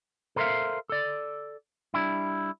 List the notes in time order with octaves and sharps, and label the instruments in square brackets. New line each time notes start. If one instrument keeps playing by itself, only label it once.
[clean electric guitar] A4 A#4 C5 D5 E5 F5
A4 D5
G3 D4 E4